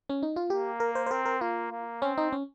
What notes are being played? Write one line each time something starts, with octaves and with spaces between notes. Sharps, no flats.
C#4
D#4
F4
A#3 G4
A#4
C5
C5
C4 A#4
A#4
A#3 F4
A#3
C4 C#4
D#4
C#4